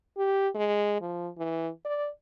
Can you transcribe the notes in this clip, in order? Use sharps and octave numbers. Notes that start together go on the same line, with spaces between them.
G4
G#3
F3
E3
D5